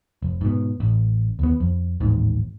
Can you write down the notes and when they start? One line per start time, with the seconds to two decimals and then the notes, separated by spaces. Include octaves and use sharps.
0.22 F1
0.41 G#2 B2
0.80 A1
1.39 D#2 B3
1.60 F2
2.00 A1 D#2 G#2